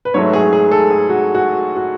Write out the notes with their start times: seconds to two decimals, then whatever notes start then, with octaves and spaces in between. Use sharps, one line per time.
0.05 B4
0.14 G#2 F#3 A3 C#5
0.33 G#4
0.53 G#4
0.71 A4
0.91 G#4
1.09 F#4
1.35 F#4
1.76 F#4